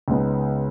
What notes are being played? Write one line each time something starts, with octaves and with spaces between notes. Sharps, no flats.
C#2 C#3 G#3 B3 D#4